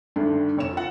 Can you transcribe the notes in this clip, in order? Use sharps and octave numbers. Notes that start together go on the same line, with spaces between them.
D2 G2 D3 D#3
F1 C#5 E7
F4 F#5